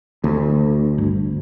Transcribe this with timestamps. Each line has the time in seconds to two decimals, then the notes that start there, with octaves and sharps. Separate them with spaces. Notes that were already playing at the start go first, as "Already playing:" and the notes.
0.24 D2
0.98 G1